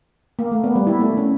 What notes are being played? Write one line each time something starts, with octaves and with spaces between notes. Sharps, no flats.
A#3
A3
B3
G3
E4
A3
C#4